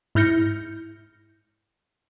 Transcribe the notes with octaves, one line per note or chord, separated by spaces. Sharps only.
G#2 E4 F6 G6 A#6 C#7